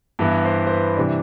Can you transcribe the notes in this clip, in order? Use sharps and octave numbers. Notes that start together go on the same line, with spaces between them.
G2 E3 B3 E4
C5
C5
B4
C3 E3 G3 D4